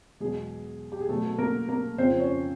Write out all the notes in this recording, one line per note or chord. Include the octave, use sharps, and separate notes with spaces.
E2 B2 F#3 G#3 G#4
G4
G#4
B2 F#3 A3 A4
A4
A#3 A#4
A#3 A#4
F2 C#3 F3 C4 C5
C#4 C#5